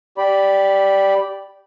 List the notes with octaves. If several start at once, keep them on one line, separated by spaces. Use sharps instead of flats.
G4 D5 B5